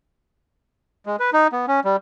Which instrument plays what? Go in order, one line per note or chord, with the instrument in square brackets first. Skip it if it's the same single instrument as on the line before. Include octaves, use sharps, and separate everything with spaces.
[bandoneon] G#3
B4
D#4
B3
C#4
G3